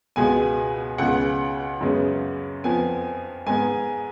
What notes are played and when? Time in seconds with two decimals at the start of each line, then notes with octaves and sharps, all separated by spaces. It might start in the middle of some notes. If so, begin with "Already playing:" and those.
0.16 C#2 B2 G#3 B3 G#5
0.98 C#2 C#3 G#3 B3 F#5
1.81 F#2 C#3 G#3 B3
2.64 F2 F3 B3 G#5
3.46 G#2 G#3 B3 G#5